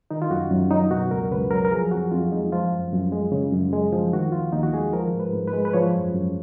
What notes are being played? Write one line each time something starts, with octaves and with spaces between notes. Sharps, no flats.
D#3 D#4
F4
F#2 F#4
F#2
F#3 D#4
B2 F#4
C#2 A#4
C#2 B4
F#3 A#4
A#4
F3 G#4
F2 F#4
F2 F4
G#3 D#4
F3 F4
F#2
F#2
G#3
C#3
F#2
G#3
F3
D#3 F#4
D#2 F4
D#2 D#4
F#4
G#3 G#4
F3 A#4
G#2
B4
G#2
B4
G#3
B4
F3 C#5
F#2
F#2